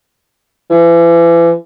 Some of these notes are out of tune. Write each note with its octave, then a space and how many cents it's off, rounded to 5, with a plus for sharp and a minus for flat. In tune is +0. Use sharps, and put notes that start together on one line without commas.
E3 +35